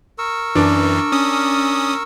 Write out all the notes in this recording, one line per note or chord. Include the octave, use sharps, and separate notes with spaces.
A#4 C#6 E6
F#2 E3 D4
C#4 D#6